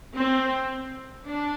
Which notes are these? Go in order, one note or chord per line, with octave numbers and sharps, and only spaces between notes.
C4
D4